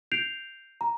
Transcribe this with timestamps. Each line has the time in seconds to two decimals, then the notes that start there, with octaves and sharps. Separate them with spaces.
0.12 G6 C7 D7 F7
0.81 A#5